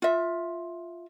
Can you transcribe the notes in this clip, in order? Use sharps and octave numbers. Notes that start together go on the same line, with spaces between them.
F4 E5